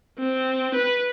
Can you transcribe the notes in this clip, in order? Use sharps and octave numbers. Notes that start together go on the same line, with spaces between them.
C4
B4